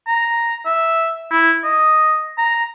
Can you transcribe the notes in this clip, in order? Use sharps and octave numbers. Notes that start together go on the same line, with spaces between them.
A#5
E5
E4
D#5
A#5